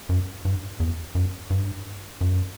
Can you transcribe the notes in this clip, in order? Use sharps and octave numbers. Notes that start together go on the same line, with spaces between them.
F#2
G2
E2
F#2
G2
F#2